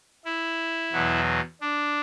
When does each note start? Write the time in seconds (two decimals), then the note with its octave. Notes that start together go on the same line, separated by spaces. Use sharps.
0.25 E4
0.93 E2 B2 F#3
1.61 D4